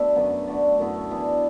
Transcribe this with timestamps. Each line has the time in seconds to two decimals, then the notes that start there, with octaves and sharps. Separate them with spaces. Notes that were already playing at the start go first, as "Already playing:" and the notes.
Already playing: B2 A3 D4 B4 E5
0.16 F#2 D3 F#3 B3
0.47 D3 A3 F#4 D5
0.79 F#2 D3 B3 E4
1.11 E3 B3 D4